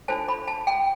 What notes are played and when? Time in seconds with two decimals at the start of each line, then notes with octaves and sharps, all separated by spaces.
0.08 D4 F4 A4 C5 A5
0.28 B5
0.48 A5
0.67 G5